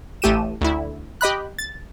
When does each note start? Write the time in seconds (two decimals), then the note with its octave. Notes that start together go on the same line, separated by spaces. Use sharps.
0.22 A1 A3 G4 D#7 E7
0.61 D2 E4
1.21 G4 D#5 B5 F#6
1.59 A6